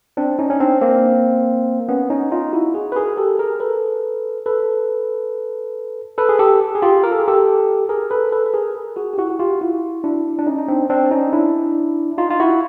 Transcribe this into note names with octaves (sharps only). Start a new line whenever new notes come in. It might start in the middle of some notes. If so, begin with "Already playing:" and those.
C4 D4
C#4 D#4
C#4
C4 D4
A#3 C4
B3 C#4
C#4 D#4
D#4 F4
E4 F#4
F#4 G#4
B4
G#4 A#4
G4 A4
G#4 A#4
A4 B4
A4 B4
A4 B4
G#4
G4 A4
G#4
F4 G4
A#4
A4
G#4
G4 A4
G#4 A#4
A4 B4
A4 B4
B4
G#4 A#4
F#4 G#4
G4
E4 F#4
F#4
F4 G4
E4 F#4
D4 E4
D4
C#4 D#4
D#4
C4 D4
C4 D4
C#4 D#4
D4 E4
D#4 F4
F4
E4 F#4